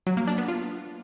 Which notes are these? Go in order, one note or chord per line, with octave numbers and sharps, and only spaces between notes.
F#3
A#3
D4
B3
F4